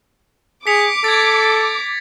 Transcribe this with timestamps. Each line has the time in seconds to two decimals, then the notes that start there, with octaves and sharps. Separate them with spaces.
0.67 G#4 D6 B6 C#7 F7
1.04 A4 G#6 A6